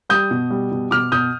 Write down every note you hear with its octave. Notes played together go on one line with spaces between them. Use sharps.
G3 D#6 G6
B2
G3
B2
B2 D6 F6
B2 D#6 G6